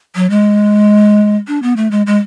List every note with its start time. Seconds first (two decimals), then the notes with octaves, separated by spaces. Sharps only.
0.15 F#3
0.30 G#3
1.47 D4
1.62 B3
1.76 A3
1.91 G#3
2.06 G#3